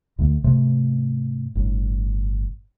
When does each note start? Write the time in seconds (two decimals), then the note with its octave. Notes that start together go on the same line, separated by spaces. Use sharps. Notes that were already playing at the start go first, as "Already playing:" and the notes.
0.18 D2 D3 A3
0.44 G#2 C3 A3
1.55 G1 A2